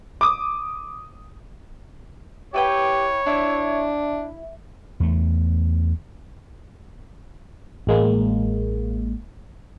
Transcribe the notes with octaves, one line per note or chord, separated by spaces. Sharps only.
D6 D#6
E4 G4 B4 C#5 G5
D4 E4
E2 A3
A1 G#3 A#3